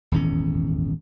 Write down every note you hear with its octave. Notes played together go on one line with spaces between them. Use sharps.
D#1 G#1 E2 C#4